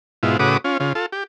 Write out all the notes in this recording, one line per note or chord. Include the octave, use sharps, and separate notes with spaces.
G#2 B2 E4 F4
A2 C#3 F#4 B4 D6 D#6
C#4 F4
C#3 F4
F4 A4
G4